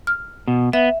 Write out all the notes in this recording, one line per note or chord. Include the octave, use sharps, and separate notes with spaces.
F6
B2
B3 E5